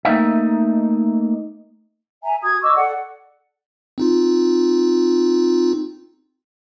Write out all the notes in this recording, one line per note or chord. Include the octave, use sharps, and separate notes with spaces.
A3 A#3 D#4 E5
E5 G#5 A#5
F#4 D#6 G#6
D#5 C#6 D6 E6
A4 D5 F#5
C4 D#4 F4